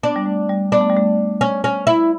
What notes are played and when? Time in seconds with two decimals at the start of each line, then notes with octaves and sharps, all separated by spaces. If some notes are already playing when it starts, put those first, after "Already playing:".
0.03 B3 D4
0.16 G3
0.26 A3
0.50 G3
0.72 B3 D4
0.81 A3
0.89 G3
0.97 A3
1.41 C#4
1.64 C#4
1.87 E4